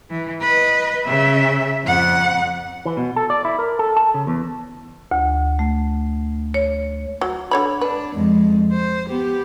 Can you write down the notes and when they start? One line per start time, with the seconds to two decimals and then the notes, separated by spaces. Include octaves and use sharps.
0.10 E3
0.42 B4 D#5
1.05 C#3 E5
1.85 F2 F#5
2.86 E3
2.97 B2
3.16 A4
3.30 D5
3.45 E4
3.59 A#4
3.79 A4
3.97 A5
4.14 C#3
4.27 E2
5.11 D2
5.59 A3
6.54 C#5
7.21 F#3
7.51 D3 C#5 B5
7.81 D4 B4
8.15 F2 G#3
8.72 C5
9.09 B3 G4